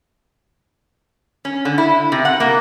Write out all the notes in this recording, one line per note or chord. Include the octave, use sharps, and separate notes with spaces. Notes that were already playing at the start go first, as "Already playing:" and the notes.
C#4
D3
E4
C3
F#5
A#3